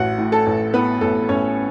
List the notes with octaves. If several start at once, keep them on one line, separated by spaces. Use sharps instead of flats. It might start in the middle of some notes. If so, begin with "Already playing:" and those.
Already playing: A1 F#4 F#5
A2
A4 A5
A1
A2 B3 B4
A1 A4
A1 C#4 C#5